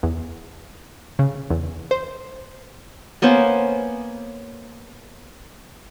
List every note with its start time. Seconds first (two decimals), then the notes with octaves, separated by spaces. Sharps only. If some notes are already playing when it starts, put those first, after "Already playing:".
0.03 E2
1.19 C#3
1.50 E2
1.91 C5
3.22 A#3 B3 C#4 C5